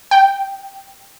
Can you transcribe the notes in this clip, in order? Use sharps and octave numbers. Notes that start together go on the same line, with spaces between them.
G5